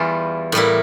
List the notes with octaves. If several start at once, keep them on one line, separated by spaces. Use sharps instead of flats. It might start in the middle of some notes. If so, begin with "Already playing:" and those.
Already playing: E2 E3 G3 F4
A2 G3 A#3 E4